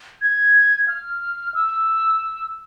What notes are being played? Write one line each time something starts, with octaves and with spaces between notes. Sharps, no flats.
G#6
F6
E6